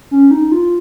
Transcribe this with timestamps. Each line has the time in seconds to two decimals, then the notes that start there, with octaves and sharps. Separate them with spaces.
0.11 C#4
0.31 D#4
0.52 F4